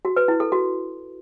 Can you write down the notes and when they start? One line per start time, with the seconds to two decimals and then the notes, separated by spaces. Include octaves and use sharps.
0.05 F#4
0.16 B4
0.28 E4
0.40 A4
0.52 F#4